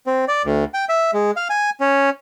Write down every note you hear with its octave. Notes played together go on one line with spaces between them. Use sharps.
C4
D5
D2
G5
E5
G#3
F5
G#5
C#4